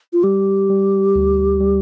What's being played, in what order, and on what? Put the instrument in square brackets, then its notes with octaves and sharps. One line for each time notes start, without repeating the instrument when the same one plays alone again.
[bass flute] F4
[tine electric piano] G3 [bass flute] G4
[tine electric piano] G3
D2
G3